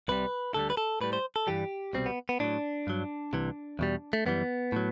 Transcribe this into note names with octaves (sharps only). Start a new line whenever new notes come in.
C2 C3 G3 B4
D2 D3 G3 A4
B4
A4
A2 G3 B4
C5
A4
G2 E3 G3 G4
C2 B2 G3 C4
B3
B3
A2 F#3 D4
G2 F#3
C2 C3 E3
E2 B2 G3
A3
F#2 E3 G3 B3
A2 F#3